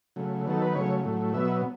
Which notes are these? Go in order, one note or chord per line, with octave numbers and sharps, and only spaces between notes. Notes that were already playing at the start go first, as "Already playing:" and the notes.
C#3 F#3 A3
D#3 F#3 B3 A4
B4
C#3 F#3 A3 C#5
A2 F#3 A3
B2 F#3 B3 E5